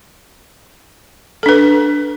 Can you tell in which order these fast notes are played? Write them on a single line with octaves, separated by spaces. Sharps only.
A4 D4 B4